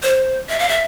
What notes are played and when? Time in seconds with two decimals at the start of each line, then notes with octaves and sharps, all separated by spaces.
0.03 C5
0.49 E5
0.59 F5
0.69 E5